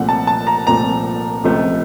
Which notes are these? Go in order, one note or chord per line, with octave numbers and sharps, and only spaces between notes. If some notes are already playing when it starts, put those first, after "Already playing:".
Already playing: C2 A#2 F3 A3 F#5
A5
A5
A#5
C2 A#2 F3 A3 A#5
C#2 C3 F3 A3